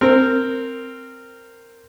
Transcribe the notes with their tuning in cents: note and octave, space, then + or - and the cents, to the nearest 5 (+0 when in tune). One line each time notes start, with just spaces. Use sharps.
C4 +0 A#4 -15